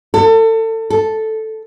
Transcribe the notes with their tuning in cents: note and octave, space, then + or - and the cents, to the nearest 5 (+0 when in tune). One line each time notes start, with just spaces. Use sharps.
A4 +30
A4 -5